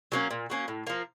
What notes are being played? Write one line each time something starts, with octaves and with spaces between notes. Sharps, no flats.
F#3 A#3 C#4
A#2
F#3 A#3 C#4
A2
F3 A#3